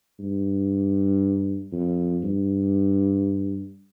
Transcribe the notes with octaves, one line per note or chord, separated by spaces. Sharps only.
G2
F2
G2